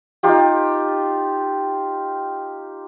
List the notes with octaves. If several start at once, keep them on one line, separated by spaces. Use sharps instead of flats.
D#4 F4 G4